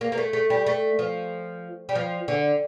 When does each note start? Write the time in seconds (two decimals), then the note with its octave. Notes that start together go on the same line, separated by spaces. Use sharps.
0.01 A#3
0.12 A#3
0.18 A3
0.33 A3
0.50 G3
0.66 A3
0.99 F3
1.89 G3
1.95 F3
2.28 D3